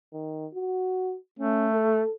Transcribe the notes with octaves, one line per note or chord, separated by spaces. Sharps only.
D#3
F#4
A3 C#4
A4